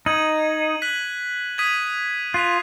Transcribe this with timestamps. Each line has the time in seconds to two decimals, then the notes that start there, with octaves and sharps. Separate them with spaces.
0.06 D#4 G#6 D#7 F#7
0.82 F#6 B6 F#7
1.58 D#6 G#6 B6 D#7 F#7
2.34 F4 F#6 B6 F7